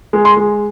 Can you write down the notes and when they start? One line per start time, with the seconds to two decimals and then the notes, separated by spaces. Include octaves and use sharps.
0.13 G#3
0.25 C6
0.37 G#3